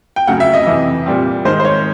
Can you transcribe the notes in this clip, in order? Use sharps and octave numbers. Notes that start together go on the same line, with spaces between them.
G5
D2 C#3 F#3 F#5
E5
D#5
F2 C3 E3
A#2 G3 C4
G#2 D#3 G#3 C5
C5
C#5